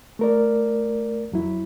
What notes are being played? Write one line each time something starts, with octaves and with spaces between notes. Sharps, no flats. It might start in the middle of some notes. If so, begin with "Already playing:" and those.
A3 A#4 D5
F2 F#3 E4